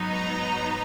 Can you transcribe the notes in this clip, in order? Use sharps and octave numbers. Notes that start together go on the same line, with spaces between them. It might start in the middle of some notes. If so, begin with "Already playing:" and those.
Already playing: G#2 F#3 B3 D#4
A#5